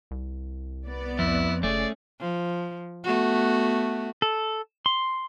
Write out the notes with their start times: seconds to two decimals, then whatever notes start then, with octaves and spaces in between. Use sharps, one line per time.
0.11 C2
0.86 B3 D5
1.19 F2 E4
1.63 F#1 A3 C#4 G#4 D5
2.20 F3
3.04 A3 B3 F#4
4.22 A4
4.86 C6